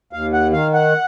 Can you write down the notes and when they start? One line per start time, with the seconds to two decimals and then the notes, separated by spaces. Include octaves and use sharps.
0.13 D#2 F5
0.33 F#5
0.53 D#3 F5
0.74 F#5